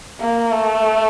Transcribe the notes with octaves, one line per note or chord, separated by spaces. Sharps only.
A#3
A3